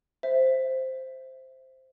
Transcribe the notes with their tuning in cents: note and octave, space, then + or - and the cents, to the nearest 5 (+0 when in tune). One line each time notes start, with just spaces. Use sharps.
C5 +0 E5 +0